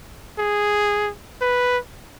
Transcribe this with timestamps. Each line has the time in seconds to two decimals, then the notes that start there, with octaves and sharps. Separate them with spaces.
0.39 G#4
1.42 B4